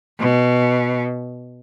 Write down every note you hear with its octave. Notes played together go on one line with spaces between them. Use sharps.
B2